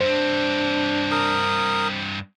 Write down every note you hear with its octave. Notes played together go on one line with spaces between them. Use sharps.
G2 C4 D4 C5
A#4 D#6